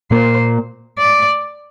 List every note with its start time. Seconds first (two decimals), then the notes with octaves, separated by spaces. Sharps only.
0.11 A#2 A#3 C5
0.99 D5